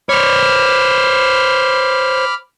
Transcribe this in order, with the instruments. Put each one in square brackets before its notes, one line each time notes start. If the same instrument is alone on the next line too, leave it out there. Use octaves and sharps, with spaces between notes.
[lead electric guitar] C5 C#5 [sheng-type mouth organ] B5 D6 F6